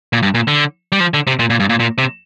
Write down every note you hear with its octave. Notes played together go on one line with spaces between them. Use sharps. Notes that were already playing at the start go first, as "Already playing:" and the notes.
A#2
G2
A#2
D3
G3
F3
D3
C3
A#2
A#2
G2
A#2
A#2
C3